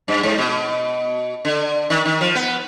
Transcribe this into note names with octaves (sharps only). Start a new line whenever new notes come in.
G2
G#2
B2
D3
D#3
D#3
F3
B3